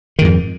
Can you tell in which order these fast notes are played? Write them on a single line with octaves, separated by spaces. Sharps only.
D#3 G#2 F2